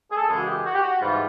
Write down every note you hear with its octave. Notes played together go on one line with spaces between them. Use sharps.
G#4
A4
F#2 C#3 E3 G#3 G#4
F#4
G4
F#4
G4
F#4
G#2 E3 G3 F4